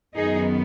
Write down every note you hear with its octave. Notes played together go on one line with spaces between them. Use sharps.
F#2 D#3 B3 D#4 G#4